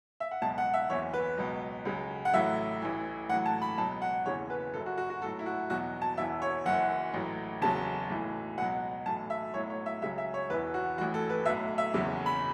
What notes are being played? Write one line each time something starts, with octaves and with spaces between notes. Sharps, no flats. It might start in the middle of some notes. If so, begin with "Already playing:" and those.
E5
F#5
C#2 B2 F#3 A5
F#5
E5
F#1 E2 E3 C#5
B4
C#2 B2 F#3
C#2 C#3 F#3
F#5
A1 A2 F#3 E5
A1 A2 E3
A1 A2 F#3 F#5
A5
B5
C#2 B2 F#3 A5
F#5
F#1 E2 C#3 E3 C#5
B4
F#1 F#2 F#3 A4
F#4
F#4
F#4
B1 A2 F#3 A4
E4
F#4
E2 B2 F#3 F#4
A5
E1 E2 E3 E5
C#5
F#1 F#2 E3 F#5
A1 A2 F#3
F#1 E2 C#3 F#3 A5
B1 A2 E3
C#2 B2 F#3 F#5
B1 A2 E3 A5
E5
B1 A2 F#3 C#5
C#5
E5
C#2 C#3 F#3 E5
E5
C#5
E1 E2 E3 B4
F#4
A1 A2 E3 F#4
A4
B4
B1 A2 F#3 E5
E5
F#1 E2 C#3 F#3
B5